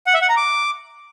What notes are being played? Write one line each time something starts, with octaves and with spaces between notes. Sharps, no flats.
F#5
E5
F#5
A#5
D6